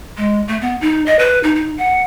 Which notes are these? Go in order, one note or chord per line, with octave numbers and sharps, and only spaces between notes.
G#3
A3
B3
D#4
D#5
B4
D#4
D#4
F#5